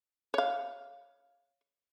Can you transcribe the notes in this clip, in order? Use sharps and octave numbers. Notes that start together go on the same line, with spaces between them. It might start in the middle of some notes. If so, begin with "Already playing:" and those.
C#5 F5